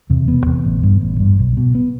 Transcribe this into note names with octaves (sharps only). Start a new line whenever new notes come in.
E2 C3
E1 B3
E2 C3
A1
G2
A1
G2
B1
B2
B3